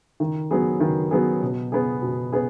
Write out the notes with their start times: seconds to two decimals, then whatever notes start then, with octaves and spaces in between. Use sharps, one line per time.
0.20 D#3
0.51 F#3 B3 G#4
0.80 D#3
1.11 F#3 B3 G#4
1.42 B2
1.72 B3 G#4
2.02 B2
2.32 B3 G#4